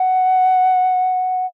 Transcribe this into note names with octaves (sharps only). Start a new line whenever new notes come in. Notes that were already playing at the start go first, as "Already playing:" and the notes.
Already playing: F#5